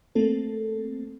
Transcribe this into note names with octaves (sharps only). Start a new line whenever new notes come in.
A3 A#3 C4 A4